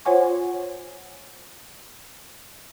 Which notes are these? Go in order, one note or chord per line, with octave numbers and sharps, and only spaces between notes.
F4 C5 C#5 F#5 G#5 C#6